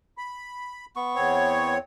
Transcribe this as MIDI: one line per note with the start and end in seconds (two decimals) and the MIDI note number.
0.18 0.85 83
0.96 1.75 59
0.96 1.75 85
1.15 1.78 40
1.15 1.78 60
1.15 1.78 73